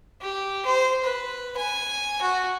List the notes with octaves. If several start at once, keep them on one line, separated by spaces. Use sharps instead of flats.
G4
C5
B4
G#5
F#4